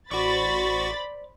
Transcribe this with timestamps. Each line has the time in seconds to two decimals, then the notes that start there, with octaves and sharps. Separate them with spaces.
0.11 A1 F#4 C5 D5 B5 C#6 A6